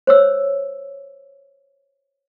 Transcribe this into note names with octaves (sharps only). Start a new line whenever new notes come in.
C5 C#5 E6